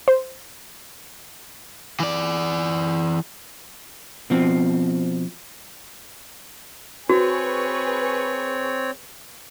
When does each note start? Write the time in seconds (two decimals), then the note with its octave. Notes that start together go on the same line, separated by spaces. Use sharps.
0.08 C5
2.00 E3 D5
4.30 B2 F3 C4
7.10 C4 F#4 G#4 B4 C#5 C#6